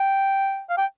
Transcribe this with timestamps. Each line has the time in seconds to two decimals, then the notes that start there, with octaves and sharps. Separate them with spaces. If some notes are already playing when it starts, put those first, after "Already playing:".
Already playing: G5
0.69 F5
0.77 G5